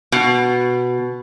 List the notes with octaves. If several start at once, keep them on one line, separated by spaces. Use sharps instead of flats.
B2